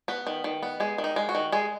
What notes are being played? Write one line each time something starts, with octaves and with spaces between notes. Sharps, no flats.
B3 B4
D#3
D#3
B3
G#3 G#4
D#3
D#4
G#3
F#4
D#3
G#3 G#4